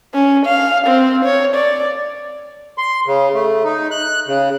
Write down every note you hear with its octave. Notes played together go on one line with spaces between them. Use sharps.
C#4
F5
C4
C#5
D5
C6
C#3
A3
D#4
F#6
C#3